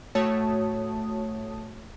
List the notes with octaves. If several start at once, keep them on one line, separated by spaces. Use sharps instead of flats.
A2 A3 F#4 C#5 A5 D#6